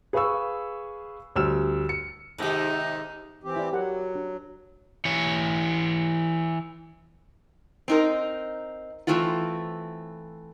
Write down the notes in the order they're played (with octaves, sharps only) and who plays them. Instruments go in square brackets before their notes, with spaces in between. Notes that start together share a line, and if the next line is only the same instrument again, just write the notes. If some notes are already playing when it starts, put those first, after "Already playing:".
[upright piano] G#4 B4 F5 B5 C#6 E6
D2 G3 E6 F6 E7
C#7
[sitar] G#2 C3 D#3 [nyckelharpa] D#4 [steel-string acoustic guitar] G4 F#5
[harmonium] E3 C4 G4
[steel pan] E4 D5
[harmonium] F#3 [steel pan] G4 A#4 F#5
[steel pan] D4
[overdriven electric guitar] E3 C#5
[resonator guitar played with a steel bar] C4 D#4 A#4
E3 A3 C4 E4 F4